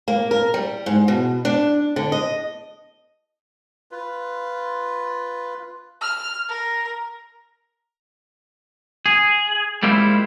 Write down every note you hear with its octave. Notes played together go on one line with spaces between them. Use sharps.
A#3
A#4
G3
G#2
B2
D4
D3
D#5
F4 B4
F6
A#4
G#4
G3 G#3 A#3 E4 F4 C5